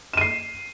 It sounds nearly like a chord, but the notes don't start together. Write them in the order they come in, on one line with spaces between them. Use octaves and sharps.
E7 D#7 C7